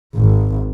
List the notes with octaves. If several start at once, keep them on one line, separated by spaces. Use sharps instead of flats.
G#1